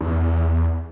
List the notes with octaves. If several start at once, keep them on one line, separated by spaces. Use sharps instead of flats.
E2